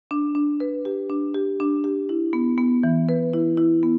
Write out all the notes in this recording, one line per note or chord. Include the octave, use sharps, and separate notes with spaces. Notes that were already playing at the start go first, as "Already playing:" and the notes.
D4
D4
B4
G4
D4
G4
D4
G4
E4
B3
B3
E3
B4
E4
E4
B3